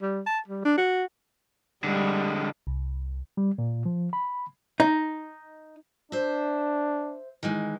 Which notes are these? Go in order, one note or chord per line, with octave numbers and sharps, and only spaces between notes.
G3
A5
G3
D4
F#4
D3 G3 G#3
C2
G3
A#2
F3
B5
D#4
D4 C5 E5
D#3 E3 G#3